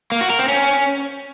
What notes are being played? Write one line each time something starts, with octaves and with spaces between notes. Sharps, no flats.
A#3
F#4
A#4
C4
C#4